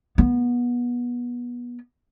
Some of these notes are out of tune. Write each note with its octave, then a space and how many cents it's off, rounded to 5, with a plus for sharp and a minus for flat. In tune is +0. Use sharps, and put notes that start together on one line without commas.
B3 -25